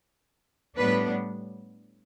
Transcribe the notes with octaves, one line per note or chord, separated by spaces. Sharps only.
A2 G3 B3 D4 B4